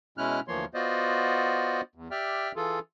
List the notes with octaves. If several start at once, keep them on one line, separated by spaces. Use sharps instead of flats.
B2 G#3 C#4 E4 F6 F#6
D2 E3 F3 A#3 C#5 C6
B3 F4 F#4 C5 D5 D#5
E2
G4 D5 E5 G5 F6
E3 F4 G#4 A4